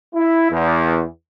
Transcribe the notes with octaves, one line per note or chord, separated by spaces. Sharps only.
E4
E2